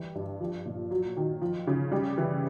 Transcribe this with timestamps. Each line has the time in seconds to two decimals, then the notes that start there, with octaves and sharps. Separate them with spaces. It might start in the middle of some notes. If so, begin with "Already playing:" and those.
Already playing: E3 G3
0.15 G2
0.40 F3
0.66 A#2
0.91 F#3
1.17 D#3
1.42 F3
1.67 C#3
1.92 G3
2.18 E3